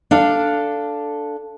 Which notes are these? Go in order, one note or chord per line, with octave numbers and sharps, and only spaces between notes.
D4 A4 F5